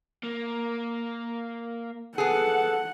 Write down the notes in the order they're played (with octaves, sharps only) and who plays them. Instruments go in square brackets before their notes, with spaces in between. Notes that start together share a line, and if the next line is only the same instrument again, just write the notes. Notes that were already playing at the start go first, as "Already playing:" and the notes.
[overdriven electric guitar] A#3
[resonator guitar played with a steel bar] B3 G#4 [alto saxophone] A4 [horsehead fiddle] F#5